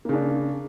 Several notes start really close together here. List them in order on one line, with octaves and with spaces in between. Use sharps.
A#3 C#3 D4